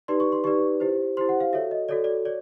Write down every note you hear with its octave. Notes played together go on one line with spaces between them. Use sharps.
D#4 G4 B4 D5 C6
C#6
C6
D#4 G4 B4 D5 C#6
E4 G4 C5
E4 G4 C5 C6
F#5
F5
F#4 A4 C#5 E5
D#5
F#4 A4 C#5 D5
D5
C#5 D5